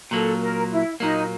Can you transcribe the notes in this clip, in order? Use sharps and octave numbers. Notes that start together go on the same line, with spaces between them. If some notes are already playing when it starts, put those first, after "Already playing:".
A#2 F#3 A#3 A4
A#4
E4
A#2 F#3 A#3 D#4